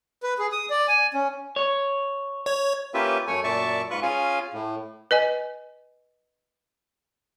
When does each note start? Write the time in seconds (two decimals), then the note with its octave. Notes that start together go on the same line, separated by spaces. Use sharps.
0.23 B4
0.39 G#4
0.52 D#6
0.70 D5
0.88 G#5
1.14 C#4
1.56 C#5
2.46 C#5
2.94 A#3 C#4 F4 G4 B4 E5
3.27 F#2 A3 C#5 G#5
3.44 F#2 A#2 D5 E5 A5 C#6
3.91 G#2 F4 B4 C#6 F#6
4.02 C#4 F4 G#4 F5 G#5
4.53 A2
5.11 B4 D#5 G#5